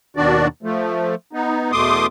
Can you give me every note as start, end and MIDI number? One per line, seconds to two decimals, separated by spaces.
0.17 0.48 39
0.17 0.48 47
0.17 0.48 51
0.17 0.48 62
0.17 0.48 66
0.17 0.48 74
0.63 1.15 53
0.63 1.15 57
1.33 1.72 59
1.33 1.72 63
1.72 2.06 40
1.72 2.06 47
1.72 2.06 57
1.72 2.06 84
1.72 2.06 86
1.72 2.06 87